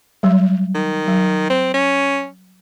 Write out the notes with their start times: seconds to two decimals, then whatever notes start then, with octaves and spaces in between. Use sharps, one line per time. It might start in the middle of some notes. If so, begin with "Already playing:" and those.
0.23 F#3 G3
0.75 D#3
1.08 F#3
1.50 C4
1.74 C#4